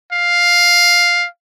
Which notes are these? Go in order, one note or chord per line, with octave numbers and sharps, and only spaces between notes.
F5